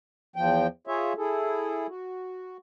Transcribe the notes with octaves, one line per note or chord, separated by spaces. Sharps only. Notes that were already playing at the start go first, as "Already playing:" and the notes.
E2 F3 G5
F4 G#4 C#5 E5
E4 G#4 A4
F#4